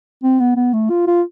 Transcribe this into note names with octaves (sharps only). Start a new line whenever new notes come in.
C4
B3
B3
A3
F4
F4